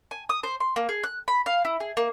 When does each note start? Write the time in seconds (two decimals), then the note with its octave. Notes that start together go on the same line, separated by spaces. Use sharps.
0.11 G#5
0.29 D#6
0.43 C5
0.60 C6
0.76 A#3
0.89 G#4
1.03 F#6
1.28 B5
1.46 F5
1.65 E4
1.80 G#4
1.97 A#3